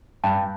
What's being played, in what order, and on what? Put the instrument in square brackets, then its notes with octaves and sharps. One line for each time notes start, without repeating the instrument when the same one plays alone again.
[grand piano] G2 [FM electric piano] G5 A5